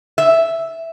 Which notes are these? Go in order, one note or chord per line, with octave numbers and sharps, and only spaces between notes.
E5